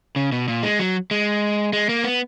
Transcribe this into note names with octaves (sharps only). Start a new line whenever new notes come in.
C#3
B2
A#2
G#3
F#3
G#3
G#3
A#3
B3